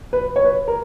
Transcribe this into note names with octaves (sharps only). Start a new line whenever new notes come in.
B4
C#5
B4
A#4